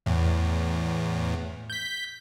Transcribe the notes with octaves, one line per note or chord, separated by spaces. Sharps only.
E2 A2
G6 B6